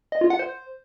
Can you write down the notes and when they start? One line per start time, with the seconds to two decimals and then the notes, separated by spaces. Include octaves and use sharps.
0.12 D#5
0.21 F4
0.30 F#5
0.39 C5